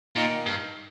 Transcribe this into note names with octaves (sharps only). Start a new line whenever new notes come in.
A#2 D#3 A#3 D#4
G2